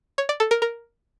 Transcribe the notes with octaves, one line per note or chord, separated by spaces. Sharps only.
C#5
D5
A4
A#4
A#4